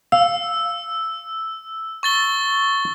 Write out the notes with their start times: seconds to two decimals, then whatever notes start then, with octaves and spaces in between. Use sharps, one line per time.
0.12 F5 E6
2.03 C#6 A6 G7